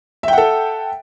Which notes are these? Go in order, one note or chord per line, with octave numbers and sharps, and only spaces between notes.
A4 E5 F#5 G5